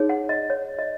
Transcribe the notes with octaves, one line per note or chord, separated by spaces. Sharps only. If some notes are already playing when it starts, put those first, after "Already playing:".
Already playing: D#4 G#4 C#5
F#5
D#5
C#5
D#5